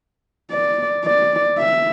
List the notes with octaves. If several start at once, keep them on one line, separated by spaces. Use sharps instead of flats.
D5
D5
E5